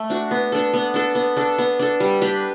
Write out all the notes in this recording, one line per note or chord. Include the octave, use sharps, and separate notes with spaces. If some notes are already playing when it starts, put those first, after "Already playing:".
Already playing: A3
D4 F#4
B3
D4 A4
B3
D4 A4
B3
D4 A4
B3
D4 A4
G3
D4 G4 B4